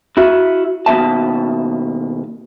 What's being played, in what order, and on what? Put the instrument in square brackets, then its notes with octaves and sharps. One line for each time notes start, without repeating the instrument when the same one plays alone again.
[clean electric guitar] E4 F#4 E5
D#2 B2 A3 E5 A5